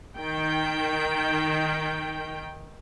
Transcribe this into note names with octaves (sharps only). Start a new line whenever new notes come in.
D#3 G5